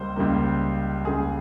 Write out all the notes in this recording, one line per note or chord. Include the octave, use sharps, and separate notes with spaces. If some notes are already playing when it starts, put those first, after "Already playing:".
Already playing: C#2 C#3 G3 A#3 C5
C#2 C#3 G3 A#3
C#2 C#3 G3 A#3 G#4